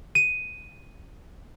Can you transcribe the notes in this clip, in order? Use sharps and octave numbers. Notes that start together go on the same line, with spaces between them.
D#7